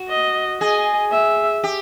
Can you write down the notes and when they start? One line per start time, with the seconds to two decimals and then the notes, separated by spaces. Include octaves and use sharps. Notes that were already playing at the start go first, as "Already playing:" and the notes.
Already playing: F#4
0.09 D#5
0.61 G#4 D#5
1.12 E5
1.64 G4